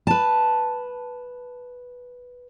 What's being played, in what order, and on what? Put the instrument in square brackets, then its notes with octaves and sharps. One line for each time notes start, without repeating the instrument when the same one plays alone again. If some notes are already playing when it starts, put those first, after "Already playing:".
[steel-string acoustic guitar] B4 A5